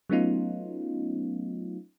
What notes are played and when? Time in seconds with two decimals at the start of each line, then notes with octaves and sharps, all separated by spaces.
0.10 F#3 A3 B3 C#4 D#4 F4